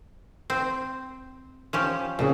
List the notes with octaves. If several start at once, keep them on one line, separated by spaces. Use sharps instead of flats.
C4
F3 C#4 G4
F2 A#2 C#3 G#4